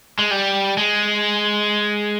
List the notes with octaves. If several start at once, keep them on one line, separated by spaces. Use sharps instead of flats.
G#3
G3
G#3